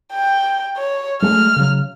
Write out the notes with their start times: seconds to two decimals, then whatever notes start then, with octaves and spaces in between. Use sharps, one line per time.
0.13 G5
0.77 C#5
1.22 F#3 G#3 A3 F6
1.56 C#3 F#3